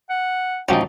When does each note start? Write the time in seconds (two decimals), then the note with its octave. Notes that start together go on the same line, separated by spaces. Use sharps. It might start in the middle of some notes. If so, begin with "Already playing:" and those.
0.09 F#5
0.69 A1 F3 F#3 C#4 D#4 G5